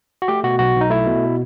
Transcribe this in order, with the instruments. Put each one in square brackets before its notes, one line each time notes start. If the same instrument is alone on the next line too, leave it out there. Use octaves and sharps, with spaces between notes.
[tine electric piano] F#4
A3 G4
B2 F#4
B1 F#4
B1
D#4
A3 E4
B2